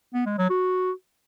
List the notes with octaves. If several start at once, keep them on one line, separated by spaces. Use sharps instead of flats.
B3
G#3
F#3
F#4